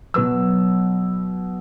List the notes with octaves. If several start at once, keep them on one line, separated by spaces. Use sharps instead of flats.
B2 F#3 B4 E6